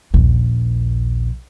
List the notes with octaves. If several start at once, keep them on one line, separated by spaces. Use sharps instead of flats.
A#1 D#2